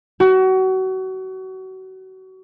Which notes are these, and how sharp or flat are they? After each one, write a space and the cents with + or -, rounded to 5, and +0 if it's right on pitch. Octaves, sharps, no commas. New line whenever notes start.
F#4 +30